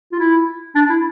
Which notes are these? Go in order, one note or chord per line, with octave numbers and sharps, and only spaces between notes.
F4
E4
D4
E4